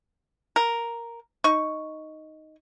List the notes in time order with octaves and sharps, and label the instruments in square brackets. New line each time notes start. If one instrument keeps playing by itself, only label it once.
[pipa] A#4
D#4 C#6